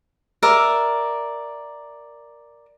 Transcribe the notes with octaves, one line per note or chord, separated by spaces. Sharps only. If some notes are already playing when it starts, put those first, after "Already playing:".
A#4 D5 E5